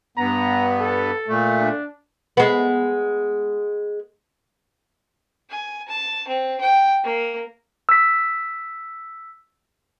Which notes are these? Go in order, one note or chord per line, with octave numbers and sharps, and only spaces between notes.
G2 B3 A#5
A4
A#2 A3
D4
G#3 B3
G#5
A5
C4
G5
A#3
E6 B6